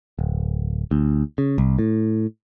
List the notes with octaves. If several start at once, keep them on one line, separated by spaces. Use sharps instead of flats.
D1
D2
C#3
C2
A2